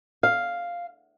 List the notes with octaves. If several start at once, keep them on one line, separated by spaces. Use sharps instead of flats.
F5